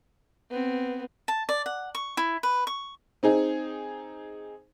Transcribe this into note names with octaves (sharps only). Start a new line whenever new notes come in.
B3 C4
A5
D5
F#5
C#6
E4
B4
C#6
C4 D#4 G#4